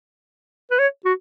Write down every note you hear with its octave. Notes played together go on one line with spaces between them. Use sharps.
B4
C#5
F#4